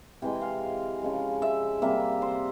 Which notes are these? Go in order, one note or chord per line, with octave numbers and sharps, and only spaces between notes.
C3 E3 G#3 G5
F5
C#3 F3 G#3
E5
C3 G3 A#3 E5
C5